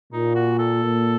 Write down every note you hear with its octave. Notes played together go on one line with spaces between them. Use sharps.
A#2 D#4
F#4
A4
A#2